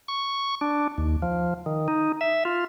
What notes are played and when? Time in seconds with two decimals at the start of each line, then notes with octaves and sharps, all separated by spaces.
0.08 C#6
0.61 D4
0.98 D#2
1.22 F3
1.66 D#3
1.88 D#4
2.21 E5
2.45 F4